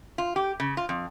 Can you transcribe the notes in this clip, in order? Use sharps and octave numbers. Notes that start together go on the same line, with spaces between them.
F4
G4
C#3
F4
F2